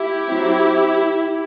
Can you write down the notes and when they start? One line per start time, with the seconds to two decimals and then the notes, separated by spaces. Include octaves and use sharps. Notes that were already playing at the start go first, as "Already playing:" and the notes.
Already playing: E4 G4
0.27 F#3 C4